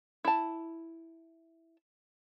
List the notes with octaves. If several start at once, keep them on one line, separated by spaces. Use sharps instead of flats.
E4 A5